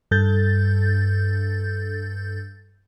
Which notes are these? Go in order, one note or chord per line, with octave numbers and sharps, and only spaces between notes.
G2 A4 G6 A6